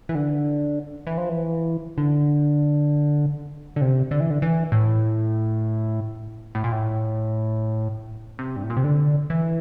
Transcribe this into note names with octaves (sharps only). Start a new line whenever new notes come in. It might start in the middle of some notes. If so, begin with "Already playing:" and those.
E3
D3
E3
F3
E3
D3
D3
C3
D3
E3
D3
E3
A2
A2
A#2
A2
C3
G2
A2
A#2
C3
D3
E3